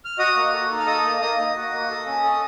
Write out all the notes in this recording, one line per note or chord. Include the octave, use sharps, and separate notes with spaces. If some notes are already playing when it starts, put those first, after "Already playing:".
F6
F#4 D#5 D#6
A#3
A4
D#4
F6
A4 D#5 D#6
A#3
A#3 D#5 D#6
D#4
F#4
A#3
A4
C#4
A4